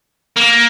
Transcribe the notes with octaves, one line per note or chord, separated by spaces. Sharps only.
A#3